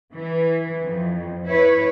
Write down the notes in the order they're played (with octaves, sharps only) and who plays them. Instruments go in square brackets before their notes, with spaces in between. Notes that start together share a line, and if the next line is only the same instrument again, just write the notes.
[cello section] E3
F2
E4 B4 C#5